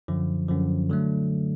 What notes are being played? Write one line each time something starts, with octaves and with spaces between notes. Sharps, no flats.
F#2 D3 F3
F#2 D3 F3
D3 F#3 A3